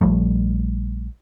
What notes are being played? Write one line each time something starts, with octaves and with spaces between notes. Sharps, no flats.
A#1 F3 G3 A3